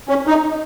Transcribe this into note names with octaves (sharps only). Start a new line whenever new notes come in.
C#4
D#4